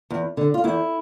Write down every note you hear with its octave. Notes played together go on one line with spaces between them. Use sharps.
E2
D3
F4
E2 E4